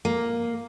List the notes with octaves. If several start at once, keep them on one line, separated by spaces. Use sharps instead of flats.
A#3